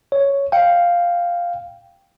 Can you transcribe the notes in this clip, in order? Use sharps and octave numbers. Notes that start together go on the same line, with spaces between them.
C#5
F5 G5